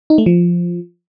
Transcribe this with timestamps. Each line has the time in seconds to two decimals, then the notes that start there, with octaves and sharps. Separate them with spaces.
0.10 D#4
0.18 A3
0.26 F3